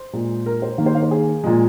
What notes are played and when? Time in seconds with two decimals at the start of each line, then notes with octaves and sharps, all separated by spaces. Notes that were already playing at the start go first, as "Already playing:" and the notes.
Already playing: C5
0.13 A#2 G#3
0.46 A#4
0.62 C5
0.78 D#3 A#3 F5
0.86 C5
0.95 F5
1.03 C5
1.11 G#4
1.44 A#2 F3 G#3